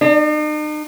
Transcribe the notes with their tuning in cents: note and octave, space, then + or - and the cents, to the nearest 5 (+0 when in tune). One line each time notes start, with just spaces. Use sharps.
D#4 -45